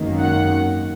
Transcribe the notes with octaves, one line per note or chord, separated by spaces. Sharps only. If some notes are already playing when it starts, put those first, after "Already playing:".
Already playing: G#1 F#2 D#3 A#3
F#5